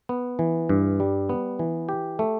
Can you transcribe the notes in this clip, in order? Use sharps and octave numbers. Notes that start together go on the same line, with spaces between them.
B3
E3
G2
G3
B3
E3
G4
A3